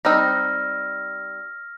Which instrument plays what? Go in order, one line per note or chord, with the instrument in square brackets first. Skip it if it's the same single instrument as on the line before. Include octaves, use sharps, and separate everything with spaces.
[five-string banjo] G3 C4 D#4 [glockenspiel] E6 F6 A#6